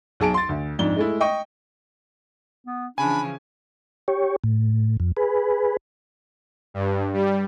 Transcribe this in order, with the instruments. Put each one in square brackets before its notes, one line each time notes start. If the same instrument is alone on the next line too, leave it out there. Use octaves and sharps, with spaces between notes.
[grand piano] B1 G#4 A5 D7
C6 A6
D2
F2 G#2 D4 G7
G#3 A3 E4
D#5 G5 C#6
[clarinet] B3
[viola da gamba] C#3 E3 F3 [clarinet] D4 [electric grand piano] G#5 [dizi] B5
[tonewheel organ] G4 C#5
A2
F2
G#4 B4
[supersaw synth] G2
G3